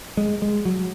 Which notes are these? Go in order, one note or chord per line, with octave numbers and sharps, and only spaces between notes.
G#3
G#3
F#3